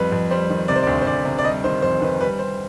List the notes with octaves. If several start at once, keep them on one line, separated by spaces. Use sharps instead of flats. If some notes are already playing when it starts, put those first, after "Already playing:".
Already playing: F2 G3 B4
F2
G3 C5
D#3
C3 D5
C5
D5
D2
C5
D2 D5
C3
D5
G3 D#5
D#3 C5
F2 C5
D#3 B4
G3 B4
G3 C5